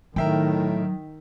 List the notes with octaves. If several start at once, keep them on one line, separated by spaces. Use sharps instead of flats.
A2 D#3 F#3 A#4 E5 G5